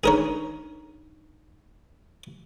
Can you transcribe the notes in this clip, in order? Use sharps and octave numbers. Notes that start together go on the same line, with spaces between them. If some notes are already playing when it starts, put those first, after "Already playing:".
D4 D#4 G#4 A#4 C#5 A#5